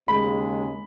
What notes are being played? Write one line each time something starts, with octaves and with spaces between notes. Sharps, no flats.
D#2 C#3 G#3 B5